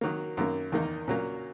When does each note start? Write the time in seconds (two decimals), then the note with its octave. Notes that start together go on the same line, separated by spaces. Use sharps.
0.01 D#3 F#3 A#3
0.37 F#2 D#3 A#3
0.72 E2 D#3 A#3 D#4
1.08 A#2 F#3 A#3 C#4